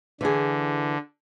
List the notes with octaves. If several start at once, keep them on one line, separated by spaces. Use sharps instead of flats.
D3 E3 G#4